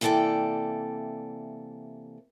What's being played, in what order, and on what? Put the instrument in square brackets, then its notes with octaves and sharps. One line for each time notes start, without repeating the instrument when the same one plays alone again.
[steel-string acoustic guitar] C3 E3 A#3 A4 D5 G5